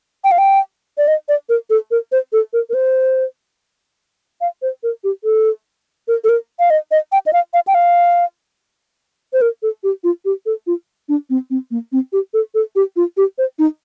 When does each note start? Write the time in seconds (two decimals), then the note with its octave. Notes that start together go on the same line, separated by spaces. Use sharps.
0.24 G5
0.31 F5
0.38 G5
0.98 D5
1.08 D#5
1.29 D5
1.49 A#4
1.70 A4
1.91 A#4
2.12 C5
2.33 A4
2.53 A#4
2.69 A#4
2.74 C5
4.41 F5
4.62 C5
4.83 A#4
5.04 G4
5.24 A4
6.08 A#4
6.24 A4
6.29 A#4
6.59 F5
6.70 D#5
6.91 D#5
7.12 G5
7.26 D#5
7.33 F5
7.54 F5
7.67 G5
7.75 F5
9.33 C5
9.41 A#4
9.63 A4
9.83 G4
10.04 F4
10.25 G4
10.46 A4
10.67 F4
11.09 D4
11.30 C4
11.50 C4
11.71 A#3
11.92 C4
12.13 G4
12.34 A4
12.55 A4
12.76 G4
12.96 F4
13.17 G4
13.38 C5
13.59 D#4